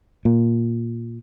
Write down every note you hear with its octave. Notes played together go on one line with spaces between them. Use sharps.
A#2